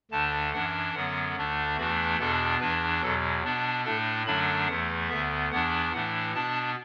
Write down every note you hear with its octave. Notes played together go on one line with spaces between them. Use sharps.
D2 D3 A3 D4 A5
F#2 E3 D4 F#5
F#2 D3 F#3 B3 F#5
D2 D3 A3 D4
E2 E3 A3 D4 F#4
E2 B2 B3 D4 A4
E2 E3 D4 B4
E2 B2 F#3 A4
B2 B3 D4
A2 A3 D4 A4
F#2 D3 F#3 A3 D4 B5
E2 E3 A3 F#5
D2 D3 B3 E5
E2 E3 B3 D4 F#5
A2 E3 A3 D4 F#5
B2 B3 D4 A5